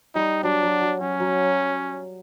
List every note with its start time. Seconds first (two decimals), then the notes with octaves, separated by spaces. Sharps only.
0.15 G3 D#4
0.43 F#3 D4
0.62 F#3
0.81 F#3
1.00 F#3 C#4
1.20 F#3